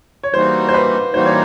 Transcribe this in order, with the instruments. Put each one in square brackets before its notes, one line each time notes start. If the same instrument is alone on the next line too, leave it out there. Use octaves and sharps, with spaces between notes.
[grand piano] C#5
[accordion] E3 G3 A#3 D#4 F#4 [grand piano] C5
[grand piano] C5
B4
[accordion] E3 G3 A#3 D#4 F#4 [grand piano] C5
[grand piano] C#5